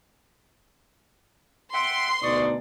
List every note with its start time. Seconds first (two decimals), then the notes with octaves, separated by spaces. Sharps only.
1.74 E5 F#5 G5 C6
2.22 D2 B2 D#4 D5 C#6 D#6